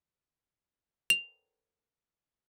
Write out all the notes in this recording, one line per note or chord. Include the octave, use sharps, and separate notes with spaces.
F7